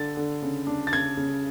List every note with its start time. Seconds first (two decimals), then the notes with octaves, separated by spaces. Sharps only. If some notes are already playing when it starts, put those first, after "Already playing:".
Already playing: D3 A6
0.17 D3
0.42 C#3
0.67 D4
0.87 A6
0.92 C#3 G#6
1.17 C#3